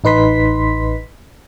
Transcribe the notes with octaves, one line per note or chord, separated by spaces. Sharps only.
A1 D#4 B4 C6 B6